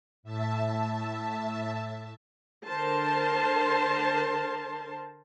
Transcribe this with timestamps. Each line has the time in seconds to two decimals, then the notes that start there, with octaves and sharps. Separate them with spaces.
0.23 A2 E5 A5
2.66 D3 A#4 C5 A5 C6